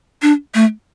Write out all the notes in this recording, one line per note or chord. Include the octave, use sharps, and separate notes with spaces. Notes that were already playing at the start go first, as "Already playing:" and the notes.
D4
A3